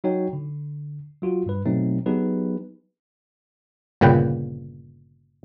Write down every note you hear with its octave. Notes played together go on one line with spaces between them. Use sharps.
F#3 D#4 F#4 C#5 G5
D3
F#3 F4 F#4
G2 G3 B4
B2 F#3 A3 C4 D#4
F#3 B3 D#4 G4 G#4 B4
G1 A#2 C#3 B4 G5